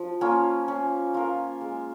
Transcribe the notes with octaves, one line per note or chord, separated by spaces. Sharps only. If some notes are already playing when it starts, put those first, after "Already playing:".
Already playing: F3
A#3 C#4 F4
C#4
F4 A#4
G#3